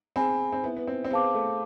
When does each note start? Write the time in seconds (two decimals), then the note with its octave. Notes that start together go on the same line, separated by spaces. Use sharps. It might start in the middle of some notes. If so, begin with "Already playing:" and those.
0.16 C4 G#4 C5 G#5 B5
0.53 C4
0.63 B3 E4 B4 E5
0.77 B3
0.87 C4
1.05 C4
1.11 B3 G#4 C5 F5 A5 D6
1.34 A3